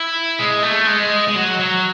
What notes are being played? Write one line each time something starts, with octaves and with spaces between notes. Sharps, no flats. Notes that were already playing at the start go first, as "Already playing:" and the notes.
Already playing: E4
G#3
A3
G#3
G#3
F#3
F#3